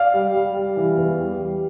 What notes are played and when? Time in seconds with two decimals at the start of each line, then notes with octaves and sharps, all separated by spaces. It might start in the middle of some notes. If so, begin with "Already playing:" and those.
Already playing: D5 F5
0.14 G3
0.34 G3
0.56 G3
0.76 E3
0.98 E2
1.19 G3
1.40 G3